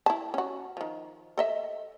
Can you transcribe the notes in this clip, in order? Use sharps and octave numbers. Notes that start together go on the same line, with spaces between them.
E4 A5
C#4 F#4
D#3 F3
A4 D#5 E5